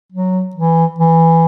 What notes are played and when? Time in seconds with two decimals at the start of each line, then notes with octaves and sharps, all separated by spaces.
0.12 F#3
0.55 E3
0.98 E3